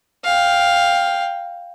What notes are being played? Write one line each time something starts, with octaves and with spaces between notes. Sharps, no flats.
F5 G5